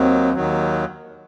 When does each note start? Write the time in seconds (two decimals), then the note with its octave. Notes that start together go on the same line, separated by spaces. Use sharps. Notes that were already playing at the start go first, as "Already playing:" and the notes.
Already playing: D#2 D#3 F#3 C4
0.34 D#2 D#3 F#3